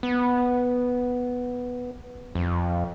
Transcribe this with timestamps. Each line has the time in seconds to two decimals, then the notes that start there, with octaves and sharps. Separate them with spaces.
0.03 B3
2.35 F2